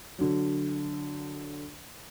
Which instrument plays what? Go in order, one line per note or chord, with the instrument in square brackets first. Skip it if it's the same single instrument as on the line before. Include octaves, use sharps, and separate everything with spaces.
[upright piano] D3 F#3